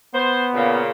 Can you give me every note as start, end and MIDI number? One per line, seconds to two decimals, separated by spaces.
0.14 0.81 59
0.14 0.45 72
0.54 0.91 46
0.54 0.91 49